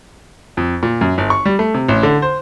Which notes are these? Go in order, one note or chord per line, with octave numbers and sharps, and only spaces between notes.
F2
A#2
F#2
G1
C#6
G3
A3
C3
A1
D3
C5